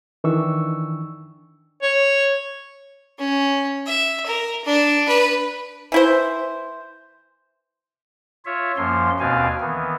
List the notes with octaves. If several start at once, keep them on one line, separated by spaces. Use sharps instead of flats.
D#3 E3 D4 C#6 E6
C#5
C#4
E5
A#4
D4
B4
E3 E4 C5
F4 C#5 E5
F#2 F3 A#3 C6
D#2 B2 C4 D4 F5 G#5
D#3 E3 B3